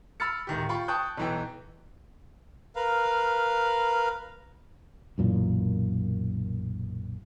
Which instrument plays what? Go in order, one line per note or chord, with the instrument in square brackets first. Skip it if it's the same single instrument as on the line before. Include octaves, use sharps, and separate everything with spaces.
[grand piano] B5 E6 F6 A6 C#7
D1 D#3 G4
F4 G5 B5 C#6
G5 A5 C#6 D#6 F#6 G6
B1 E3 G5
[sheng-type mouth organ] A#4 B4 F5
[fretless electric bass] B1 F#2 A#2 E3